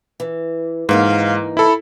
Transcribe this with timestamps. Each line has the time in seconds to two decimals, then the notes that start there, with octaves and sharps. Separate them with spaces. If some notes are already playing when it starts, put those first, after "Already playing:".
0.20 E3
0.89 G#2 E3 A#3 D#4 F5
1.57 E4 A4 B5